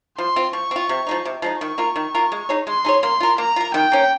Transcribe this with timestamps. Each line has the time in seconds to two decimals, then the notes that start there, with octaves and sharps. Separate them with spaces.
0.18 F3 C6
0.36 C4 F4
0.53 F3 C#6
0.71 C4 F4
0.89 C3
1.07 F3 G#3 D#4
1.25 C3
1.42 F3 G#3 D#4
1.60 D#3 C#6
1.78 A#3 F4 A#4
1.96 D#3
2.15 A#3 F4 A#4
2.32 G#3
2.49 D#4 G#4 C#5
2.67 G#3 C6
2.85 D#4 G#4 C#5
3.02 A#3 C6
3.20 F4 A#4
3.38 A#3 A#5
3.56 F4 A#4
3.74 D#3 G5
3.92 A#3 C#4